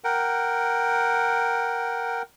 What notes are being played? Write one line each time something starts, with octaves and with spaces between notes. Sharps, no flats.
A#4 F#5 G5